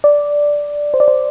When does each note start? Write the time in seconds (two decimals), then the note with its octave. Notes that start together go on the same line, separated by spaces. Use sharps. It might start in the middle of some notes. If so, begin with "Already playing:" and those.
0.04 D5
0.94 C5
1.00 D5
1.08 C5